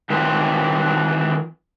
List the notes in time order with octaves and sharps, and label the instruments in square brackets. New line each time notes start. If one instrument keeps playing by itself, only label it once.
[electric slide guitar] D#3 E3 F#3 C4 E4 F4